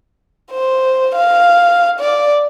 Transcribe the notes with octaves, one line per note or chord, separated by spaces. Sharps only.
C5
F5
D5